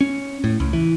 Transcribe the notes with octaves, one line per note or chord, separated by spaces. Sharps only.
C#4
A2
C#2
E3